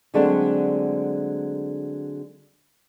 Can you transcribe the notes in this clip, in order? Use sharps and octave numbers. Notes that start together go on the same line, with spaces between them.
D3 F#3 G#3 A3 C4 D4